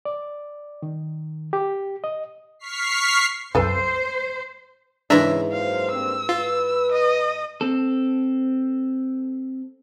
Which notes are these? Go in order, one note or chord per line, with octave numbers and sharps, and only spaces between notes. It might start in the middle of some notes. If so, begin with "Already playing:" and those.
D5
D#3
G4
D#5
C#6 F6 B6 C7
C2 F#2 A4 B4 C5
G#2 C#3 E3 C#4 D4 E5 A#5
F#2 A#3 C5 F5
G2 A#3 C4 E6
F4 B4
D#5
C4 A4